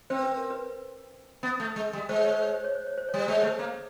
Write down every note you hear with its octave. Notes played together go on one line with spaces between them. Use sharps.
C4 C5
B4
A#4
B4
B3
A3
G#3
G3
G#3 C5
C#5
C5
C#5
C5
C#5
C5
C#5
C5
C#5
G3
C5
G#3 C#5
A3 C5
A#3